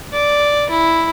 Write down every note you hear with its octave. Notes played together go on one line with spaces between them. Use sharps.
D5
E4